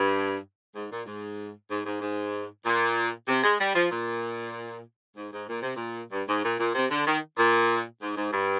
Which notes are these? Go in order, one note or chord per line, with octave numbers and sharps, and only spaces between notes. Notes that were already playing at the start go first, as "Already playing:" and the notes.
Already playing: G2
G#2
A#2
G#2
G#2
G#2
G#2
A#2
C3
G#3
G3
F3
A#2
G#2
G#2
A#2
C3
A#2
G2
G#2
A#2
A#2
C3
D3
D#3
A#2
G#2
G#2
G2